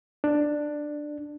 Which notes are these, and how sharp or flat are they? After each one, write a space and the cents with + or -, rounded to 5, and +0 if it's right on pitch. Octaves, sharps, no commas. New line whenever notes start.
D4 +10